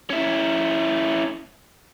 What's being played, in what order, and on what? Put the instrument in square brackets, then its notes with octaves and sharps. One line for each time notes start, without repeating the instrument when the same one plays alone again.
[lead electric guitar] C#4 E4